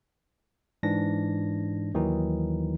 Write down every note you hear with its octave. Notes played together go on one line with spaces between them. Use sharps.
G#2 E3 D4 A#6
D#2 D#3 E3 F#3 D#4